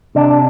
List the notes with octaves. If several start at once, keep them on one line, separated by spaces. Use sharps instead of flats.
C3 D4